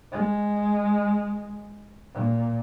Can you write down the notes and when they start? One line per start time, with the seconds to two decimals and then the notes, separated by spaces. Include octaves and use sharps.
0.12 G#3
2.14 A#2